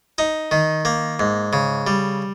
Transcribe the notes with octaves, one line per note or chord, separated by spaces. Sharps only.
D#4
D#3
A#3
G#2
C#3
G3